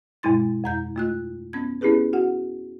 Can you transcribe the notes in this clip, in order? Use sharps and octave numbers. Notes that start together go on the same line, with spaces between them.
G2 B2 G#3 E4 C6 A6
F2 A#5 G6
A3 F4 F#6
B3 C#4 G#6
B3 C#4 E4 G4 G#4 B4
F#4 F#5